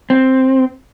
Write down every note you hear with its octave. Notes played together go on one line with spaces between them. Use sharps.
C4